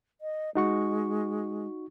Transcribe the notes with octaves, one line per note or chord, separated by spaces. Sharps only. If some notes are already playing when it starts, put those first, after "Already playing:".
D#5
G#3 D#4 F#4 C#6